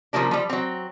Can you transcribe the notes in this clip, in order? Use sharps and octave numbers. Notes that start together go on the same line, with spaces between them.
C#3 F3 G3 G#3 A#3 D4
F3 G3
F#3 C4